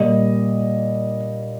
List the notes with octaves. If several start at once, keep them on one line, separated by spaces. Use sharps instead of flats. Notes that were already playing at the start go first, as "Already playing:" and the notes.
Already playing: A#2 G3 D#5